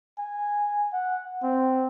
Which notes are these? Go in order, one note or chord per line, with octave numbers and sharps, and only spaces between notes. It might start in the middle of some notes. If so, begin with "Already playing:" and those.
G#5
F#5
C4